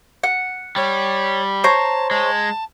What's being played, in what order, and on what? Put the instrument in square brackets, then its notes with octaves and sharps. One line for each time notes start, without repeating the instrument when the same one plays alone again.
[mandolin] F#5
[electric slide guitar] G3 [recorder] C#5
[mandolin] C5 C#5 A#5 [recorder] A5
[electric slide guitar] G#3 [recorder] A5